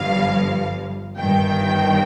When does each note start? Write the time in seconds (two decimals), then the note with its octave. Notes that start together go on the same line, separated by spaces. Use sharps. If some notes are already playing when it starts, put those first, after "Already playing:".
Already playing: G1 G2 F3 F5
1.18 G1 G2 D#3 G5